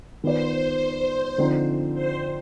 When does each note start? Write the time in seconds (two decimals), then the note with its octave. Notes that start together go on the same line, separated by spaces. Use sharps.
0.23 D#3 B3 F4 B4 C5 D5
1.38 D3 F3 C4 D#4
1.95 C5